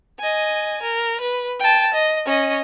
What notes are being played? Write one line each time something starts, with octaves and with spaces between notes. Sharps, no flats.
D#5 G#5
A#4
B4
G5 A5
D#5
C#4 D#5